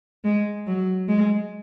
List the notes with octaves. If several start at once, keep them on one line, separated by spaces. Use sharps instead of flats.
G#3
F#3
G#3